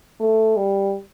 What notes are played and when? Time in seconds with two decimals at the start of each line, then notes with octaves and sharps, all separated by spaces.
0.20 A3
0.57 G3